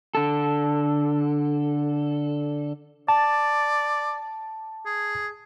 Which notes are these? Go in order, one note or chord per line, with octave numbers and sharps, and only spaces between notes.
D3 A4
D5 A5
G#4